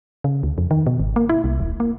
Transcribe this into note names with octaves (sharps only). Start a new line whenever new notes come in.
C#3
D2
F2
D#3
B2
G#1
A#3
E4
C2
D#1
A#3